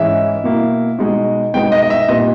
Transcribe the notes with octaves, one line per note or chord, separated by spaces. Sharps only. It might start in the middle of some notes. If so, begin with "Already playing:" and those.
Already playing: G#2 E3 G#3 C#4 E4 E5
B2 A#3 E4
B2 G#3 D#4
B2 G#3 B3 D#4 G5
D#5
D#5
E5
A#2 G3 B3 D#4 D#5